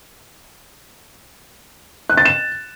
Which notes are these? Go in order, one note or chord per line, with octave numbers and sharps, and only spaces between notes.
F#6
A6
E7